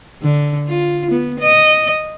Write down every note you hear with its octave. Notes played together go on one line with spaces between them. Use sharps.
D3
F4
B3
D#5